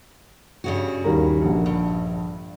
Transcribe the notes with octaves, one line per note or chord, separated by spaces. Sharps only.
G2 C#3 F#4
D#2 G3 A#4
A#1 D3
G2